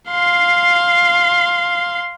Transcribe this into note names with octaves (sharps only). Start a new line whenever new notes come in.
F5 C6